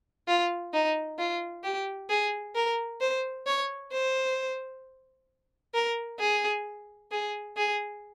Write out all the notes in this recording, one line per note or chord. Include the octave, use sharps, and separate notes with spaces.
F4
D#4
F4
G4
G#4
A#4
C5
C#5
C5
A#4
G#4
G#4
G#4